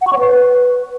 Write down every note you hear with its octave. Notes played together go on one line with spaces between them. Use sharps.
F#5
C#6
C#5
B4